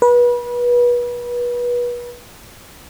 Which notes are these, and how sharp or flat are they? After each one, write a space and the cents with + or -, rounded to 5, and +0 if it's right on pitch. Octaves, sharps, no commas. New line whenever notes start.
B4 -30